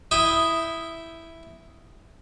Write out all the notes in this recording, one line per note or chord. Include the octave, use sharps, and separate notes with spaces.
E4 G5 D#6